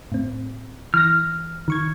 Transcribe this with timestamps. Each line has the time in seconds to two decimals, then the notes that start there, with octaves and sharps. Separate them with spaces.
0.12 A2 C4
0.94 E3 F6 A#6
1.68 D#3 C#6 G#6